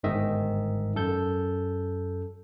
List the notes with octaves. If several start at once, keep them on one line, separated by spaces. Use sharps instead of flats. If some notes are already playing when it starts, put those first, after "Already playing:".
G1 G#2 D#3 D#5 E5
F#2 A4 G6